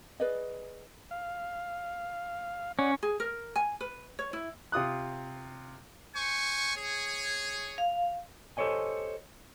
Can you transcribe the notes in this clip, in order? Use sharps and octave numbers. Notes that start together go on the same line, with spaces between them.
G#4 B4 D5 D#5
F5
C#4 C#5 D5 F#5
G#4
A#4
G#5
B4
C#5
E4
C3 F4 D#6 F#6
C5 G#5 C#6
G#4 C#5
F5
G4 A4 C5 C#5 D#5 G#5